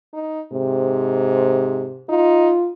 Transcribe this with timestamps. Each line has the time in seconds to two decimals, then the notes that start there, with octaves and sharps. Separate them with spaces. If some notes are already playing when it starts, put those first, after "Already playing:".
0.14 D#4
0.52 G#2 C3
2.09 D#4 F4